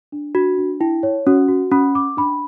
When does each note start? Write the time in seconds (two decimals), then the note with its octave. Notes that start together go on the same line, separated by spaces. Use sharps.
0.12 D4
0.35 D4 F#4
0.58 D4
0.80 E4 G5
1.03 C#5
1.27 C#4 F#4
1.48 F#4
1.71 C#4 B5
1.95 D6
2.17 D4 B5